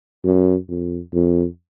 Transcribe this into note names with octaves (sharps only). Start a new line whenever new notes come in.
F#2
F2
F2